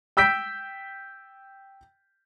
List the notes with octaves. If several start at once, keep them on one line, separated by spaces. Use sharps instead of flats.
G5 E6 G6 B6 D7